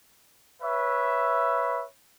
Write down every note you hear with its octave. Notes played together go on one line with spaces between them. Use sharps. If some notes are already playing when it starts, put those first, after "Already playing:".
B4 C#5 E5